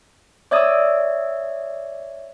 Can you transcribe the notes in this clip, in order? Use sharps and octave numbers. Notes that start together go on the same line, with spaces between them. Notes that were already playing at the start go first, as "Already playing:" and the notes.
C#5 D5 E5 D#6 E6 G#6